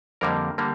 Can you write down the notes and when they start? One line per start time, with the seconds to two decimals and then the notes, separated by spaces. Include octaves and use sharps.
0.21 F2 D3 G3 A#3 A#4
0.58 D3 G3 A#3